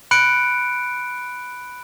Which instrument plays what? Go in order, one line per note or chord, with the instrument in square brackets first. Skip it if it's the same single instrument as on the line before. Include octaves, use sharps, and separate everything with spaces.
[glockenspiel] B5 F#6 C#7 D7